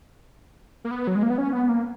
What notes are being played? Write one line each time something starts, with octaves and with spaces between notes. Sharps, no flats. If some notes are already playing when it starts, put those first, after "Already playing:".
A#3
B3
F#3
G#3
A#3
B3
C#4
B3
A#3